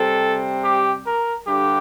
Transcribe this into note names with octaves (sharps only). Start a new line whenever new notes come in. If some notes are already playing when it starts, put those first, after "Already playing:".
Already playing: C3 G3 C4 A4
G4
A#4
G2 D3 G4